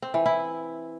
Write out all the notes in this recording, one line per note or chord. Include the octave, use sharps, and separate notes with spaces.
C4
E3
E4